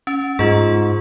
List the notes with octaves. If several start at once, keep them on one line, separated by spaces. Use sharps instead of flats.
C#4
G#2 F4 G#4